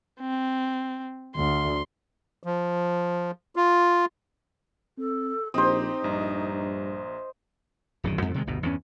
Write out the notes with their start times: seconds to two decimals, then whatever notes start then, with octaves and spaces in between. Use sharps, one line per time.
0.20 C4
1.36 D2 C6
2.43 F3
3.56 F4
4.98 C4 A4
5.54 A#1 C4 D#4 G4 C5 D#5
6.04 A#1 G2 A#5
8.04 D1 F#2 D#3
8.22 F2 G#2 C4
8.34 C3 D#3 G#3
8.47 G1 D2 B2
8.63 E2 G2 C#4